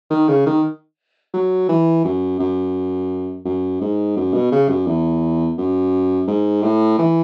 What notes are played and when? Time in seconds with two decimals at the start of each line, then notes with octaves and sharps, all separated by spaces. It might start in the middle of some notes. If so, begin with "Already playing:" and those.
0.10 D#3
0.28 C#3
0.46 D#3
1.34 F#3
1.69 E3
2.05 F#2
2.39 F#2
3.45 F#2
3.81 G#2
4.17 F#2
4.34 B2
4.52 C#3
4.69 F#2
4.87 E2
5.58 F#2
6.28 G#2
6.63 A2
6.99 E3